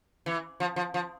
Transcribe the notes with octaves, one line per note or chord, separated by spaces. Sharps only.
E3
F3
F3
F3